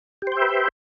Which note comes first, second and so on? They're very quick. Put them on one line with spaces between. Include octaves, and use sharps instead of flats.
G4 C5 G5 E5 B4